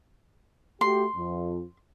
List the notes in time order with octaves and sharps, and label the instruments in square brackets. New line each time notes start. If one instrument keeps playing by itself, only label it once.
[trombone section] A3 F#4 G4 [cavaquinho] C6
[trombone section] F2